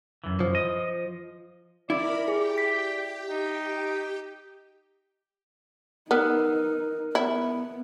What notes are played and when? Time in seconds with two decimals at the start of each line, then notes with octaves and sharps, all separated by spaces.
0.24 F#2 E3
0.40 F3
0.55 D#5
1.90 E4 A#4 D5 B5
2.28 G4 G#4 D5 G5
2.58 B6
3.30 D#4
6.11 B3 D#4 A#4 F6 F#6
7.15 B3 E4